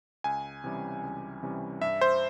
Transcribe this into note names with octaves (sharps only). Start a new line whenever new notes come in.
C#2 G#5
C3 E3 G3 C#4
C#2
C3 E3 G3 C#4
G2 E5
C5